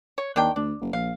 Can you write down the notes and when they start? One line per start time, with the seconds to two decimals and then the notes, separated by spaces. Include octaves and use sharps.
0.18 C#5
0.36 D#2 D#3 D4 G5
0.56 D2 D4
0.81 F#1
0.93 A#1 F5